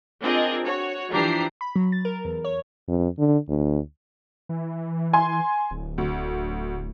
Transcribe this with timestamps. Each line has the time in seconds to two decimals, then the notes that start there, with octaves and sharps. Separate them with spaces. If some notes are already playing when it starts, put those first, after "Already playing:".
0.21 C4 D4 F4 G#4 A#4 D#5
0.64 F#4 C#5
1.12 E3 F3 D4 G4 A#5 C7
1.61 B5
1.76 F#3
1.92 A6
2.05 A#4
2.25 E2
2.45 C#5
2.88 F2
3.19 D3
3.48 D2
4.49 E3
5.13 G#5 C6
5.71 D1
5.98 D2